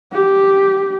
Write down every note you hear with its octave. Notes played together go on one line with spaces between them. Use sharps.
G4